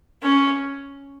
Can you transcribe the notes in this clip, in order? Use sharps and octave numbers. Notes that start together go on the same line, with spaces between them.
C#4